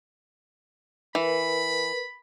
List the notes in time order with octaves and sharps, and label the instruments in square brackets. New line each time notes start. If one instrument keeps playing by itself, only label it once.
[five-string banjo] E3 [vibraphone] A#4 B4 [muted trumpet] B5